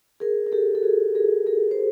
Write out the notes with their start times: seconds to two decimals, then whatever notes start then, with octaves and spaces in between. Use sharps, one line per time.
0.20 G#4 A#4
0.46 A#4
0.52 G4 A4
0.75 A4
0.83 F#4 G#4
1.15 G#4 A#4
1.46 G#4 A#4
1.71 C5